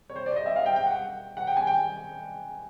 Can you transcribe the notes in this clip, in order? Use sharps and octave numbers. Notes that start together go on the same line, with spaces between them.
C#5
C5
D5
D#5
E5
F5
G5
G5
F#5
F#5
G5
G#5
G5